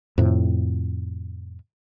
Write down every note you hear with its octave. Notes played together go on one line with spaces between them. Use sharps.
F2 A2 C3